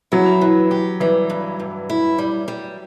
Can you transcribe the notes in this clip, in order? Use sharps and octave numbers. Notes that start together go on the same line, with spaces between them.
F#3 E4
E3
G4
E3 G3
G2
G2
E4
G3
G3